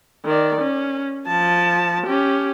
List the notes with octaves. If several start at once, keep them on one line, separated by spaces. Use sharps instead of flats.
D#3 D5
C#4
F3 A5
C#4 G4